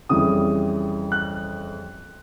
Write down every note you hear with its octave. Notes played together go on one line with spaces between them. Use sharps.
F2 C#3 E3 G3 D#6
F#6